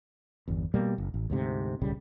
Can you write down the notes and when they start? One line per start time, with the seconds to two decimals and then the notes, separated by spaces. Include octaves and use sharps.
0.48 G1 E2
0.74 B2 G3 A#3
0.98 F#1
1.14 A1
1.30 D2 G#2 C3
1.82 D1 C2 C#3 G3